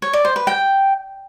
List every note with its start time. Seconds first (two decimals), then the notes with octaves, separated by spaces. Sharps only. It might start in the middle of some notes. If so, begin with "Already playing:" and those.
0.02 C#5
0.13 D5
0.25 C5
0.36 B4
0.47 G5